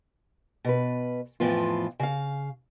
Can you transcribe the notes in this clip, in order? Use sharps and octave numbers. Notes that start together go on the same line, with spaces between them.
B2 B4
F2 A2 E3 F3 B3 F4
C#3 F5